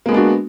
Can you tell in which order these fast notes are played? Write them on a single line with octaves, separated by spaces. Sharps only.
A#3 G#3 B3 D4 F#4